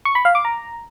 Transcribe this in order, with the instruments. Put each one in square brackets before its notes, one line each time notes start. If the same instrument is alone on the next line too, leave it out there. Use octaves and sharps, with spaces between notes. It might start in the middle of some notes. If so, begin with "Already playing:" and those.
[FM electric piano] C#6
B5
F5
D6
A#5